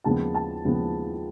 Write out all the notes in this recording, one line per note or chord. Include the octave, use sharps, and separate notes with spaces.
D#2 C#3 F3 G#3 B3 A5
A5
D#2 C#3 F3 G#3 B3